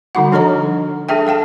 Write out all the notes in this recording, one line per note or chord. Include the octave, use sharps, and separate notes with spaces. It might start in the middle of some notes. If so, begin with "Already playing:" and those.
D3 G3 D#4 F#4 F#5
F3 D4 A4 C#5 D#5 A#5
D4 G#4 A4 E5 G5
A4 F5 G5 A5